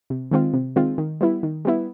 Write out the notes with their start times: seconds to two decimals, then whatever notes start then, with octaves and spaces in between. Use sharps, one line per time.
0.10 C3
0.31 D#3 G#3 C4 F4
0.54 C3
0.76 D#3 G#3 C4 F4
0.98 D#3
1.21 G3 B3 E4
1.43 D#3
1.65 G3 B3 E4